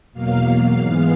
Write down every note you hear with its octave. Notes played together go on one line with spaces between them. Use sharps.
E2 B2 F#3 A#3 F5
G#2 E3 G#3 B3